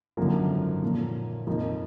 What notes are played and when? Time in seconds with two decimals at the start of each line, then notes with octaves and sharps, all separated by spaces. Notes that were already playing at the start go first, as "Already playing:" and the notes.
0.17 G#1 F#2 D3 F3 A#3
0.82 A#2 F3 A#3
1.47 F2 F3 A#3 D#4